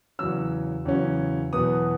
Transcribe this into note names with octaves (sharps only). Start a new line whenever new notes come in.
E2 C#3 F#3 C#4 E6
E2 C#3 F#3 C#4
E2 B2 F#3 B3 D#6